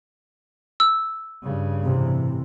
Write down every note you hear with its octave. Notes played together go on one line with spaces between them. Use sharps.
E6
G2 C#3
A2 C3 E3